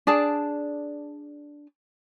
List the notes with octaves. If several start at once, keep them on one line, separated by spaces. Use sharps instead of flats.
D4 G#4 D5 A5